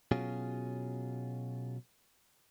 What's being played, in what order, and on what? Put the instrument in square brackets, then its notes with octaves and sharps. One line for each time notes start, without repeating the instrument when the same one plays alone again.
[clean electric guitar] B2 F#3 C#4 F4 G#4